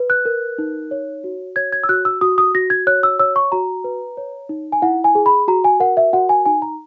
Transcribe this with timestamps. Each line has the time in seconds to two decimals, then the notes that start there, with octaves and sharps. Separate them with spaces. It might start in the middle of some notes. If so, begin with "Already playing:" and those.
Already playing: B4
0.10 F#6
0.25 A#4
0.58 D#4
0.91 C#5
1.24 F#4
1.56 C#5 G#6
1.72 G#6
1.84 E6
1.89 F#4 F#6
2.05 E6
2.21 F#4 D#6
2.38 D#6
2.55 F#4 A#6
2.70 G#6
2.87 C#5 F#6
3.03 E6
3.19 C#5 E6
3.36 C#6
3.52 F#4 A#5
3.84 B4
4.17 C#5
4.49 D#4
4.72 G#5
4.82 E4 F#5
5.04 G#5
5.15 G#4
5.26 B5
5.48 F#4 A#5
5.64 G#5
5.80 A#4 F#5
5.97 E5
6.13 F#4 F#5
6.29 G#5
6.45 D#4 G#5
6.62 A#5